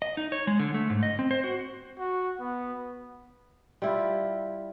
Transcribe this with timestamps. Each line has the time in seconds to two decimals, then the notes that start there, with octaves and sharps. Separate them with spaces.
0.02 D#5
0.17 D#4
0.32 C#5
0.47 G#3
0.59 D3
0.74 A3
0.90 G#2
1.03 D#5
1.19 C4
1.31 C5
1.44 F#4
1.99 F#4
2.40 B3
3.82 G3 E4 F4